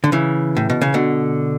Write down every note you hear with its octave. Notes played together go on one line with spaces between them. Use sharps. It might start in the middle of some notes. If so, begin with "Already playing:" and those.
D3
C#3 E3
A2
B2
C#3
B2 D3